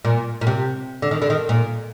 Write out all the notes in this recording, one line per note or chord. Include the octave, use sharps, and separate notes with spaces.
A#2
A#2
C3
D3
D#3
D3
D#3
A#2